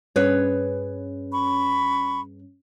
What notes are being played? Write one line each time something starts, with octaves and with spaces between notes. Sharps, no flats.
G2 C#4 G#4 B4 C#5
B5 C#6